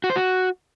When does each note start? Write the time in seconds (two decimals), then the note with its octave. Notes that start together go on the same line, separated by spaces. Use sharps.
0.04 F#4
0.10 C5
0.16 F#4